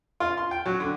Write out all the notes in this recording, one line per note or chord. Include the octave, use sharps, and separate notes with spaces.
F4
C6
G5
F#3
D3